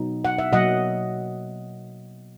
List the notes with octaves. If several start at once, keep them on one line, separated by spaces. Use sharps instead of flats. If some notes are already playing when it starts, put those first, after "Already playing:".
Already playing: B2 F#3 B3 D#4
F#5
E5
B2 F#3 A#3 D#5 F#5